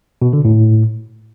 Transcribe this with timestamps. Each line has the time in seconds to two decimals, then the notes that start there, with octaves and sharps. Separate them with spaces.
0.22 B2
0.33 D3
0.45 A2